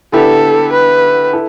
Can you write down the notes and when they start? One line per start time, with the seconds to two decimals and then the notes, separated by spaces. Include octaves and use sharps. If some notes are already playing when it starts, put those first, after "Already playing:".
0.13 D3 B3 E4 G4 A4
0.73 B4
1.33 E4 A4